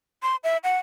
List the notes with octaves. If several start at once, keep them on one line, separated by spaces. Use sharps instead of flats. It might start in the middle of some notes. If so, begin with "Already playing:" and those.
C6
E5
F#5